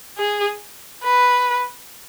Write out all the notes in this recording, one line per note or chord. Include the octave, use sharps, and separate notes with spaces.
G#4
B4